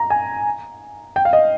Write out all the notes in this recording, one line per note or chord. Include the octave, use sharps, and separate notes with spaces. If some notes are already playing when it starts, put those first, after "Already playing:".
Already playing: A#5
G#5
G5
F5
D#5